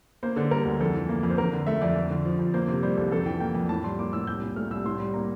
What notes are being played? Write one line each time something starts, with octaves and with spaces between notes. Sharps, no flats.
A#3 C5
D3 A4
G3 A#4
D2
F2 A4
E3
A#3
F2
C5
F2 A#4
D3
A3 E5
F2 D5
F2
D3
F3
F2
A#3 C5
C3
G3 C5
C2 A4
F2 A4
E3 G5
A#3 G5
F2
A2 A5
G3 C6
A#3 D6
A2 E6
C2 G6
A#2
A3 F6
C2 E6
A2 C6
G3
A#3 A#5